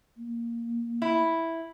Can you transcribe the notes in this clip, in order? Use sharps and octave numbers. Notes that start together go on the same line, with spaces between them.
A#3
E4